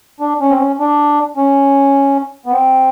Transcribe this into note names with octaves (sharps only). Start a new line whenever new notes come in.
D4
C#4
C4
C#4
D4
C#4
B3
C4